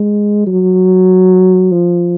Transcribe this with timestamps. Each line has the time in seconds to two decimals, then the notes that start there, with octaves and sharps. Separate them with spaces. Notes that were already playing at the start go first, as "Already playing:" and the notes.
Already playing: G#3
0.47 F#3
1.72 F3